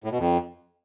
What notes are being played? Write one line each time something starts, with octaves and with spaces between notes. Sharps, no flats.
A2
B2
F2